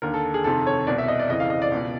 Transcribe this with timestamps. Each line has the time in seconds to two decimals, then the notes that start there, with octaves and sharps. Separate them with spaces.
0.02 D#2 D3 A#4
0.14 A4
0.34 G#4
0.44 F2 C3 D#3 A4
0.67 C#5
0.87 C2 B2 D5
0.98 E5
1.08 D#5
1.19 D5
1.29 F2 C#3 E3 D#5
1.40 F5
1.50 D#5
1.62 D5
1.72 C#2 B2